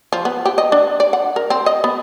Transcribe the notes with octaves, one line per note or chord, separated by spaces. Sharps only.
F3
B3
G4
D#5
D4
D5
F#5
A#4
C4
D#5
B3